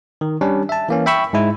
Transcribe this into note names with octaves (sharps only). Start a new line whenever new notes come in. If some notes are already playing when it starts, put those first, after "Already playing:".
D#3
G3 C#4 D4
E5 A5
E3 A#3 C#4
E5 G5 B5 C#6 E6
G#2 G#3 E4